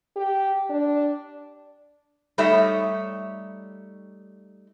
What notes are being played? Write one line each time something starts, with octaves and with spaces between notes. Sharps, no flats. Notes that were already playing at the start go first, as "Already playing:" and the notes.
G4
D4
G3 A3 D#4 G4 C#5 E5